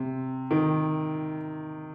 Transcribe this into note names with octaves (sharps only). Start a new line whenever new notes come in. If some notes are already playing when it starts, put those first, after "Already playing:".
Already playing: C3
D#3